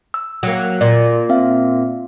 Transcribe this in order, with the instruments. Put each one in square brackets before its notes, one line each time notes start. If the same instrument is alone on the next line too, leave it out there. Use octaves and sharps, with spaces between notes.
[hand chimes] E6
[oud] F#3 A#3
[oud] A#2 [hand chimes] D5
[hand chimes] C4 E5 F5